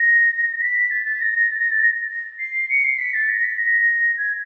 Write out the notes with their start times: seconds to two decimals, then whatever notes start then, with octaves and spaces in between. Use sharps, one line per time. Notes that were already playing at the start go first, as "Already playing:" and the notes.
Already playing: A#6
0.60 B6
0.90 A6
1.06 A6
1.20 A#6
1.35 A#6
1.50 A6
1.59 A#6
1.70 A6
1.80 A#6
2.39 C7
2.69 C#7
2.84 C7
2.98 B6
3.13 A6
3.28 A#6
3.43 B6
3.58 A#6
4.17 G#6